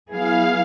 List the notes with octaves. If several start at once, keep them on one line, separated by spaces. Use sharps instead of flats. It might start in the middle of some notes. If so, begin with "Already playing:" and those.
F#3 B3 E4 G#4 F5